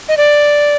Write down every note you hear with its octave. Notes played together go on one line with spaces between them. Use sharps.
D#5
D5